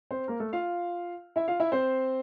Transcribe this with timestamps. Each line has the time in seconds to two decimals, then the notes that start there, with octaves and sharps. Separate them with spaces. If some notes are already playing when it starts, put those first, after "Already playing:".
0.11 C4 C5
0.28 A#3 A#4
0.40 A3 A4
0.53 F4 F5
1.36 E4 E5
1.48 F4 F5
1.60 E4 E5
1.72 C4 C5